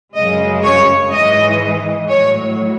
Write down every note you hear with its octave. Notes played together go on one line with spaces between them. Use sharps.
F#2 C#3 G#3 D#5
C#5
G#2 E3 G#3 D#5
A2 F#3 C#5